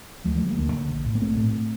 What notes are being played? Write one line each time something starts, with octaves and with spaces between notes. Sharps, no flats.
D2 F3 A3
F3 A3
D3
G3 A#3
D2 A#3 D4
D3
A#1
A2
A#3
A#1 A3 C4
A2